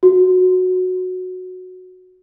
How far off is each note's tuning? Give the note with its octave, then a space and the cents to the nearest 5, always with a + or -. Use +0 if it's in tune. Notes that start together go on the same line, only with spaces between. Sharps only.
F#4 -10